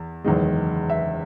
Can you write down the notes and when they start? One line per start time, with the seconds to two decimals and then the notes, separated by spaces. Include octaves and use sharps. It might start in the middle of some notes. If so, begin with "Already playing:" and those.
Already playing: E2
0.24 F#1 E2 D#3 G#3
0.90 E5